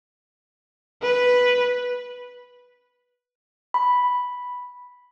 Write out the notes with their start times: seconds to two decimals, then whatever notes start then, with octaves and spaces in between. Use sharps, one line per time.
1.03 B4
3.74 B5